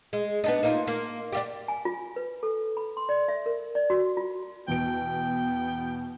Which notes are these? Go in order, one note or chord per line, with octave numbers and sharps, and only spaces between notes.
G#3
B3 D4 D#4
A#3 D#4 F4
A#3
D4 F4 G4
G#5
F4
B4
A4
B5
C6
D5
E5
A#4
D5
F#4
F4
E2 B2 B3 G5 D7